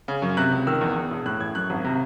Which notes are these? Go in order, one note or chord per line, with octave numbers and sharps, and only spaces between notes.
C#3
F#2
C3 F#6
C#2
D#3 E6
E2
E2
E1
A2 F#6
A1 G#6
F#2 F#6
G#1
C3